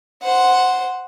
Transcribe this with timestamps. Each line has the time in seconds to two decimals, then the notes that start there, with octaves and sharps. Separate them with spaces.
0.23 C5 F#5